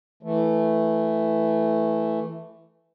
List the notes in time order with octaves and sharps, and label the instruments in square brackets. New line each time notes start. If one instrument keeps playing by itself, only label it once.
[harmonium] E3 A3